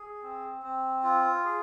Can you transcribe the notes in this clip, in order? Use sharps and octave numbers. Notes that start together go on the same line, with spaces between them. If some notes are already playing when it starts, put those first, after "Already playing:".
Already playing: G#4
C4
C4
F4
G#4